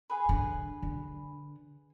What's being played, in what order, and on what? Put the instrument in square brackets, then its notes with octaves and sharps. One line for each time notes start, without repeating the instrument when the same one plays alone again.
[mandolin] G#4 B4
[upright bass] D3
D3